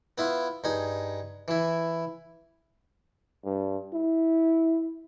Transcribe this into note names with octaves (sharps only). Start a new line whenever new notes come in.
B3 E4 F4
G2 D#4 G#4
E3 E4
G2
E4